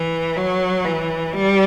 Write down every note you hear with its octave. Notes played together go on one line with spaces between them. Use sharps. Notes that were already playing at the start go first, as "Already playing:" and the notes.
Already playing: E3
F#3
E3
G3